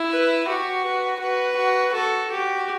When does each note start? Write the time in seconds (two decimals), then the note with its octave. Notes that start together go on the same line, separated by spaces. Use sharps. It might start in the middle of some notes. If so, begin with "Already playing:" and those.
Already playing: E4
0.10 B4
0.47 F#4 G4
0.84 B4
1.20 F#4 B4
1.57 F#4
1.94 F#4 A4
2.31 F#4 G4